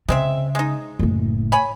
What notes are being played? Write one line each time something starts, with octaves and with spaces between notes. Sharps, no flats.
C#3 G#3 C4 E5
G#3 D#4
F#1 A2
C#5 G#5 B5